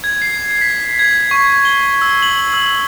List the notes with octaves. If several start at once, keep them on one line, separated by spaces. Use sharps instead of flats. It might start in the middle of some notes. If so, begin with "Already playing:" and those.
G#6
C7
B6
G#6
C#6
G7
E6
F#7
E6